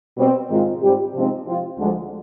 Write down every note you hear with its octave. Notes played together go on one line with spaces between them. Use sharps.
B2 G3 C4
G#2 D#3 G#3 C4 F4
G#2 G3 C4 G4
C3 F3 G#3 C4 D#4
F3 C4 F4
D2 D3 F3 G#3